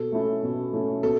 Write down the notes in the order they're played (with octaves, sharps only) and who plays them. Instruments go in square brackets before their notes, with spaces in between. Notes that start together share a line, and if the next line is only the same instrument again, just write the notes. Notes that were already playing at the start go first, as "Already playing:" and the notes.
Already playing: [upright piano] B2 [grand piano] A4
[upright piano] A3 C#4 E4
B2
A3 C#4 E4
[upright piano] B2 [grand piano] A4